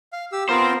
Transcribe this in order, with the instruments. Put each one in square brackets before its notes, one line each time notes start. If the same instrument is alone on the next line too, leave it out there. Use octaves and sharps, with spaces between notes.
[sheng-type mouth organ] F5
G4 E6
[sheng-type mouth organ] B3 F4 A#4 [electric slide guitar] C4 C5